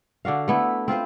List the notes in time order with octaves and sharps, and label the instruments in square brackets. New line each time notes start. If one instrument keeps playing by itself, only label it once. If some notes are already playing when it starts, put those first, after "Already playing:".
[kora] D3 D4 F#4 F5
A3 B3 E4
C4 F4 B4 C5